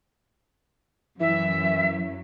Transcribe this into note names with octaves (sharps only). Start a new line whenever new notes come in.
F#2 E3 F#3 E5